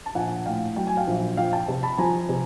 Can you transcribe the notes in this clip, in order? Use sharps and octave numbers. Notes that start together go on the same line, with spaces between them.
A5
A#1 F#5 G#5
A2 F5 G5
F#3 G5
G#5
F5 G5
A#1
F3 F5 G5
G5 A5
C3
A5 B5
F3 G#5 A#5
C3